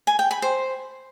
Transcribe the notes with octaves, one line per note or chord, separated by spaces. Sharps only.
G#5
G5
B5
C5